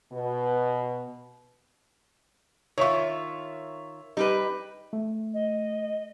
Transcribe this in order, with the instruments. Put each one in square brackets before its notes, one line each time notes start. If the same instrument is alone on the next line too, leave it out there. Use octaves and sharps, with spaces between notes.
[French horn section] B2
[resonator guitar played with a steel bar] D#3 F4 [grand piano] C#5 E5 C#6
[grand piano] G3 [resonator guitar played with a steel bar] D#4 G4 B4
[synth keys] A3
[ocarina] D#5